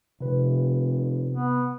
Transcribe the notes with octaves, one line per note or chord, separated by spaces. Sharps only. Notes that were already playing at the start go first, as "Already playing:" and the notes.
F1 C3 B4
B3